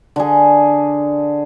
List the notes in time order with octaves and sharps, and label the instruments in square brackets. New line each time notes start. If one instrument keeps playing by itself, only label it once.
[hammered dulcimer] D3 G#4